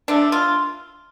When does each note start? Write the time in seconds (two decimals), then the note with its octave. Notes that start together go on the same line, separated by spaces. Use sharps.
0.08 D3 A3 D4
0.32 F4